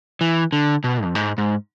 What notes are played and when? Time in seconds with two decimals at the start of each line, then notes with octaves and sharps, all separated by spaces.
0.21 E3
0.53 D3
0.84 B2
1.04 F2
1.15 G#2
1.38 G#2